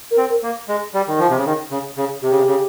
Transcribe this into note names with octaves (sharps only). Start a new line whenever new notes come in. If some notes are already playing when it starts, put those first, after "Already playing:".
A#4
C4
A#4
A#3
G#3
G3
D#3
F3
C3
C#3
D#3
C#3
C#3
C3 G4
C#3
C3
C#3